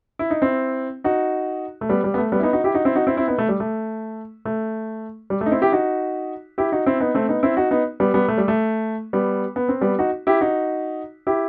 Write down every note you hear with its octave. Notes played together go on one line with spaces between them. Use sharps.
E4
D#4
C4 E4
D#4 F#4
A3
G3 B3
G3
B3
A3
G3 B3
E4
B3 D#4
D#4 F#4
E4 G4
D#4 F#4
C4 E4
D#4 F#4
C4 E4
C4 E4
B3 D#4
A3
G3
A3
A3
G3
A3
D#4
C4 E4
E4 G4
D#4 F#4
E4 G4
D#4 F#4
C4 E4
B3 D#4
A3 C4
B3 D#4
C4 E4
D#4 F#4
B3 D#4
G3 B3
G3 B3
A3
G3
A3
G3 B3
B3
C4
G3 B3
D#4 F#4
E4 G4
D#4 F#4
E4 G4